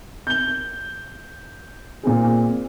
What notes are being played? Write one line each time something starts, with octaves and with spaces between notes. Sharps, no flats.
G6 G7
A#2 C4 G#4